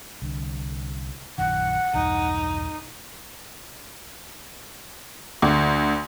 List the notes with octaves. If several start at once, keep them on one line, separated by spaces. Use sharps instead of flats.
C2 D3
A#1 F#2 D#3 F#5
B1 E2 G2 D#4
D2